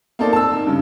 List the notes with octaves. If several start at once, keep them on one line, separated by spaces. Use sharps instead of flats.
A#3 C4 D#4 A4 D5
A5 E6
D#3
G2 C#3